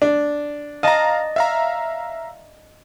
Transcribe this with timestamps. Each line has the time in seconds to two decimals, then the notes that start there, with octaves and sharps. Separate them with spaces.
0.02 D4
0.83 D#5 F5 A5 A#5 A#6
1.36 E5 F5 A#5